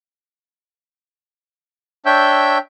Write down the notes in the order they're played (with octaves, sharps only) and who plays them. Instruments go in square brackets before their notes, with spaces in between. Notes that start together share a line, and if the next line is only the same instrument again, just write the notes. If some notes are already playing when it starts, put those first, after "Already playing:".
[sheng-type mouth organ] D4 C#5 E5 G5 E6 G6